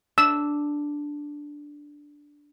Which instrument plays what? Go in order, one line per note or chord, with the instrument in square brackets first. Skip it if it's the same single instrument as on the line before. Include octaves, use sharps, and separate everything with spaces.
[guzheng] D4 [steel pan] E6